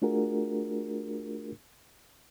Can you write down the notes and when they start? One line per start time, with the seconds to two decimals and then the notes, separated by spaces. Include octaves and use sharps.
0.02 A3 D4 F4 F#4 G#4 A#4